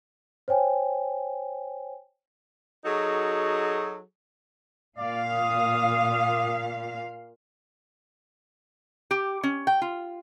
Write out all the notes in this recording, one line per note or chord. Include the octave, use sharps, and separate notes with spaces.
C5 C#5 G5 G#5
F#3 D#4 F#4 G#4 A4
A#2 D5 F5
D#6
G4
C#4
G5
F4